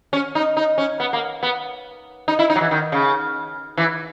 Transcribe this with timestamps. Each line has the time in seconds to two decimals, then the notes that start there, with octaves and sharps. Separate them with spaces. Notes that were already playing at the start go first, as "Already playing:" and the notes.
0.13 C#4
0.35 D#4
0.57 D#4
0.78 C#4
1.00 B3
1.13 A#3
1.43 B3
2.28 D#4
2.39 E4
2.50 D#4
2.56 F#3
2.61 E3
2.71 D#3
2.92 C#3
3.77 E3